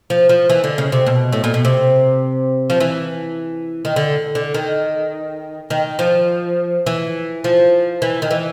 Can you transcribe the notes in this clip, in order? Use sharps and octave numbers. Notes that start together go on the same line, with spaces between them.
F3
F3
E3
D3
C#3
C3
B2
A2
A#2
B2
C3
F3
E3
D#3
D3
D3
D#3
D#3
F3
E3
F3
E3
D#3
E3